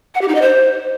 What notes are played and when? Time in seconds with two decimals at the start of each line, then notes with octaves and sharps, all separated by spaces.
0.15 F#5
0.21 G4
0.28 D#4
0.35 D#5
0.42 C5